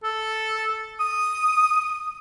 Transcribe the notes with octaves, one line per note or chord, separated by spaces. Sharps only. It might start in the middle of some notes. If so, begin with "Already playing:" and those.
A4
D#6